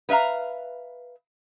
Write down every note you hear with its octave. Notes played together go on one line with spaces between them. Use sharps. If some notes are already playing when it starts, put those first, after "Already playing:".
B3 B4 E5 F5 A#5